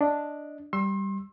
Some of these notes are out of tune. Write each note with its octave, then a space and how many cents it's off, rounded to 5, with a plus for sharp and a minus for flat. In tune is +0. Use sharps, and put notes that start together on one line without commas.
D4 +0 D#5 +0
G3 +0 C6 +35 E6 +0